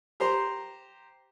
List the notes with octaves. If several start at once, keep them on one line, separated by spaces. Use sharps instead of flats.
G4 C5 A#5 C6